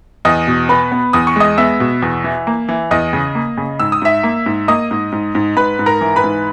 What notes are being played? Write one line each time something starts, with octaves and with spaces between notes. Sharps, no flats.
E2 D#5 D#6
B2
B3 B4 B5
B3
E2 D#6
C#6
G#3 D#5 D#6
B3 E5 E6
B2
E2
E3
A#3
E3
E2 D#5 D#6
C#3
A#3
C#3
G#2 E6
D#6
G#2 E5 E6
A#3
G#2
A#3 D#5 D#6
G#2
G#2
G#2
G#2 B4 B5
G#2
A#4 A#5
E3
B4 B5
G#2